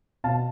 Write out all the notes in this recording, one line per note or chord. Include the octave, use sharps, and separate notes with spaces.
B2 F5 A5